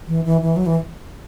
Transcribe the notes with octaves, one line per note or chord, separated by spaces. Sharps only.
E3
E3
E3
F#3
E3